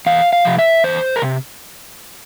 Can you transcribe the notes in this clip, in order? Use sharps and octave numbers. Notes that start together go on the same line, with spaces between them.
E2 F5
F5
C3 F3
E5
E2 C5
A#4
C3